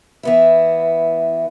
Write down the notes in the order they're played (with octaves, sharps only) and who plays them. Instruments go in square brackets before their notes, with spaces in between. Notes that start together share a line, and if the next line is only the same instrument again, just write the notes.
[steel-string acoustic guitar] E3 B3 E4